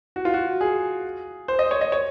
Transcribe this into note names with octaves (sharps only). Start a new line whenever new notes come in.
F#4
F4
F#4
G#4
C5
D#5
C#5
D#5
C#5